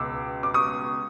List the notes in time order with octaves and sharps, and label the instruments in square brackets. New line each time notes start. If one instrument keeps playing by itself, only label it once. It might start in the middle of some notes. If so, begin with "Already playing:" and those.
Already playing: [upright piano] C#2 B2 D6 E6
D6
C#6 D#6